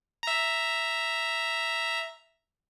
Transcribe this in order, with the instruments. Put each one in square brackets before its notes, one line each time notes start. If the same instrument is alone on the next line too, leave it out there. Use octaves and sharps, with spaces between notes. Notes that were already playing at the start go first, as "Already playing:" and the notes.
[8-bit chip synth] E5 A#5